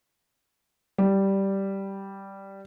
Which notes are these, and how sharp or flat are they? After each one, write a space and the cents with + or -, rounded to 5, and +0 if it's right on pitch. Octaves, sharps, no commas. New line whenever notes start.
G3 -5